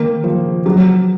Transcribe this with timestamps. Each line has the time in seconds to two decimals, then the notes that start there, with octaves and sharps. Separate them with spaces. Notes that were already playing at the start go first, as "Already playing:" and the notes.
Already playing: D#3 A#3
0.24 F3
0.66 F#3